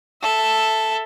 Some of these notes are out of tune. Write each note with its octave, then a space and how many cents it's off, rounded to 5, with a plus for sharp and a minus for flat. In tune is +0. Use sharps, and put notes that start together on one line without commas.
A4 +0 E5 +0